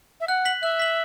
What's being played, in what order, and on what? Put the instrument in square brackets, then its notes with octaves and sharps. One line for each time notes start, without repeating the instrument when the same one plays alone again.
[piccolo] E5
[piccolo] F#5 [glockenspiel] F#6
[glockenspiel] B6 F#7
[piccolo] E5 [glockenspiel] F#6
[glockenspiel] B6 F#7